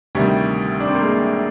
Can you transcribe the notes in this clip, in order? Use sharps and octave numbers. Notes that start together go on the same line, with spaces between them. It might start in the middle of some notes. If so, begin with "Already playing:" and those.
D2 C3 D#3 G3
D4
C4
A#3
G#3